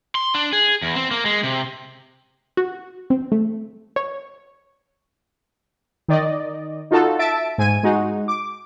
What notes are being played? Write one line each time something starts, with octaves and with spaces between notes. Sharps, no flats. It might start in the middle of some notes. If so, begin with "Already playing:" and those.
C6
D4
G#4
E2
C4
A#3
G#3
C3
F#4
C4
A3
C#5
D#3 D5 D#5
D#4 F4 F#4 A4
E5 A5 D7
G#2 G#5 D#7
G#3 D#4 F#4
D6